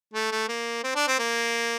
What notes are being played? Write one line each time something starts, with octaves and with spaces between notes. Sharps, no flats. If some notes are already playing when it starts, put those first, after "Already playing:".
A3
A3
A#3
C4
D4
C4
A#3